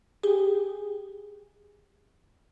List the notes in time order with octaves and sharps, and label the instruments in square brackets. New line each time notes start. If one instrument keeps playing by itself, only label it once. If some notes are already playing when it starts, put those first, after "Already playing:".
[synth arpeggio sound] G4 G#4